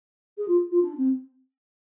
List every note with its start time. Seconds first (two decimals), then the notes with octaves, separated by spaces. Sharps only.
0.38 G#4
0.48 F4
0.71 F4
0.82 D4
0.97 C4